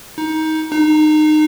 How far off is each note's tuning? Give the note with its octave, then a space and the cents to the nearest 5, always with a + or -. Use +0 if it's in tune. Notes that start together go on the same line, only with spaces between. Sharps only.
D#4 +20
D#4 -25